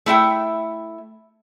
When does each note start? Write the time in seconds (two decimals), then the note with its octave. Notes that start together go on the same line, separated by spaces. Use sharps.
0.06 A3 E4 E5 G5